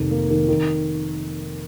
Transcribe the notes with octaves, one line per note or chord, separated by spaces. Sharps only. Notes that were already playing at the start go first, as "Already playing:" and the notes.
Already playing: F1 D#3
A#3
D#3
D#3